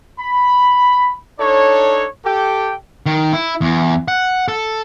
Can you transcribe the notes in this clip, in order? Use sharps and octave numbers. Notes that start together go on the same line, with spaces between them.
B5
D4 D#4 A4 C#5
G4 A4 G5
D#3
E4
E2
F#5
A4